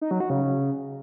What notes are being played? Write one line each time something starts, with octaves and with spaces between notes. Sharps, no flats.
D#4
F#3
F#4
C#3